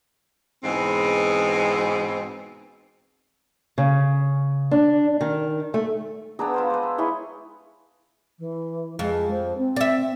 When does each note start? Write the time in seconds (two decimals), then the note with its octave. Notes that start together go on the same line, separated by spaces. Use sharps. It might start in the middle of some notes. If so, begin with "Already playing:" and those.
0.64 G#2 B2 E3 G#3 C4
3.78 C#3
4.71 D4
5.21 D#3
5.74 A3
6.39 B3 D4 E4 G#4 A#5 E6
6.54 E4 F4 C5
6.70 G#3 B4
6.83 E5
6.98 E4 G#4 C#5 C6
8.39 E3
8.99 F2 G#3
9.30 C5
9.57 C4
9.76 D5 E5